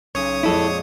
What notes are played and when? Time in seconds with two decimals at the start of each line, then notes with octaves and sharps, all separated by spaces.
0.15 B1 C#3 C#4 C#5 D#6
0.43 F2 A#2 G#3 E4 A4